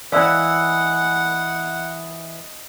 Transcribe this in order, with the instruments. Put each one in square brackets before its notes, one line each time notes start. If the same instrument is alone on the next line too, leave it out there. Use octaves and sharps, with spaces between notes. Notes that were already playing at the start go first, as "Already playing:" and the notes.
[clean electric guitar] E3 [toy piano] D5 F5 [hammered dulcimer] D#5 B5 [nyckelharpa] F#5